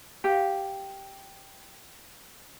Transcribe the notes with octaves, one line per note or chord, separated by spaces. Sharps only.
G4 F5